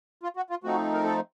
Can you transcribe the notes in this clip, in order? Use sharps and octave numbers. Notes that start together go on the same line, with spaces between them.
F4
F#4
F4
F3 A3 C4 D#4 F#4
A#4
A4